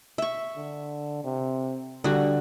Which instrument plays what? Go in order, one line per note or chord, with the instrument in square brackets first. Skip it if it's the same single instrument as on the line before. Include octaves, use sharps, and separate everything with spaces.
[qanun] E5 C#6
[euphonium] D3
C3
[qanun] D3 F#4 [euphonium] G3